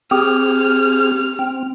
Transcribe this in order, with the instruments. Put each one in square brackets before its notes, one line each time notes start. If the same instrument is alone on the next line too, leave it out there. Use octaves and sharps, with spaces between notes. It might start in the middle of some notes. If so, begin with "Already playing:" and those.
[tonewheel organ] C4 G4 G#4 [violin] F6
[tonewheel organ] C4